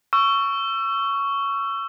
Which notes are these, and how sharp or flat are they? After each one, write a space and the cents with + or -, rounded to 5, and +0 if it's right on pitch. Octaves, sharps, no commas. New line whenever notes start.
C#6 +10 E6 +30